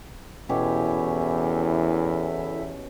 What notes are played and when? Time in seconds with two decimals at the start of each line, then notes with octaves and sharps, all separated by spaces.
0.49 E2 B2 C#4 E4 G4 A4 E5